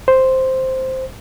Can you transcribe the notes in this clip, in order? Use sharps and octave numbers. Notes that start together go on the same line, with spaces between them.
C5